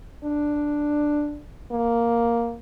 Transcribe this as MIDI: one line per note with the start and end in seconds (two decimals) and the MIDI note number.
0.24 1.39 62
1.71 2.56 58